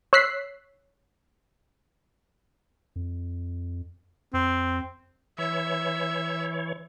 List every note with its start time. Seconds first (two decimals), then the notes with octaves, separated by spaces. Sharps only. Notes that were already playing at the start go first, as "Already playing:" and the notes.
0.13 C#5 E6 F#6 B6 C7
2.96 F2
4.34 F2 C4
5.38 E3 C#5 E5